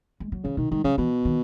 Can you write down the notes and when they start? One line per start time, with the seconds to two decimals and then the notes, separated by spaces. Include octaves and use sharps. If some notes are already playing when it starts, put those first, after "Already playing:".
0.20 G#3
0.32 F#3
0.44 C#3 E3
0.57 B2 D#3
0.71 D#3 G#3
0.84 C#3 F#3
0.98 B2 E3
1.25 D#3